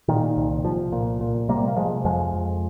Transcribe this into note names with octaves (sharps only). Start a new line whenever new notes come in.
A#2 D#3
C2
C2 F3
A#2
A#2
C3 G3 A#3
A#3
C3 F3 G#3
F2 F3 G#3
F2